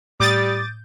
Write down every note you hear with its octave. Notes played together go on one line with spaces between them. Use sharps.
A2 G3 D6 D#6 G6 A6